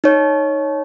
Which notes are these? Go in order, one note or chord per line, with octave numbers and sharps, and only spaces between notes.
D#4 C#5